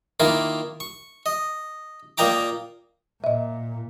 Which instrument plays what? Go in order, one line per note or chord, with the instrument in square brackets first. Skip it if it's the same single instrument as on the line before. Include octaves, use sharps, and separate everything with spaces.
[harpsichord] D#3 A#3 E4 F4 A#4 D6
C#6
D#5
A#2 A#3 D#5 G5 A#5 D6
[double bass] A#2 [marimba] D#5 E5